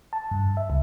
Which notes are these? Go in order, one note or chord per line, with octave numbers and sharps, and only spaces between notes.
A5
G2
E5
C#2